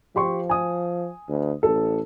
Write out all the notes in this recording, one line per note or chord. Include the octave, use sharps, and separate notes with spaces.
F3 G4 C6 C#6
G#5 D#6
D2
A1 A4